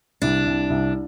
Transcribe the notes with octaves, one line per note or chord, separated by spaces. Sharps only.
C2 D4
C2
C2